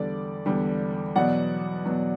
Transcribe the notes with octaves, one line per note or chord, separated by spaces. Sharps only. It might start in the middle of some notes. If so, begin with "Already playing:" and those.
Already playing: E2 D3 G3 D5
E2 D3 G3
E2 B2 F#3 D5 F#5
E2 B2 F#3